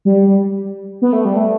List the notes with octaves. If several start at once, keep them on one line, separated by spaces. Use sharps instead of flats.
G3
B3
A3
G3
A3